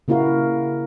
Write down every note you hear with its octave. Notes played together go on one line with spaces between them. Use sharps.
C#3 A#3 E4 F#4 A#4 F5